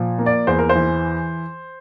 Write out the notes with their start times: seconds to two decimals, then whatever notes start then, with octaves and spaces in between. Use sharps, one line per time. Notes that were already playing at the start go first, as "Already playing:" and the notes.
Already playing: A#2 F3
0.19 A#3
0.26 D5
0.47 E2 C5
0.58 A#4
0.69 C5
0.75 E3